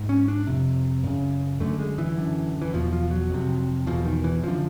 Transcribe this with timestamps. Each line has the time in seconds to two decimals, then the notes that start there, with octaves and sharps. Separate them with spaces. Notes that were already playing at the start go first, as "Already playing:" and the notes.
Already playing: G#2
0.09 C#4
0.28 D4
0.47 F2 C3
1.04 F#2 C#3
1.60 F#2 D3 A3
1.79 G#3
1.98 E3
2.17 F#2 D3
2.62 E3
2.73 E2 B2 F3
2.93 F3
3.11 F#3
3.30 F2 C3
3.87 E2 B2 F3
4.05 D#3
4.24 E3
4.43 F#2 D3 F3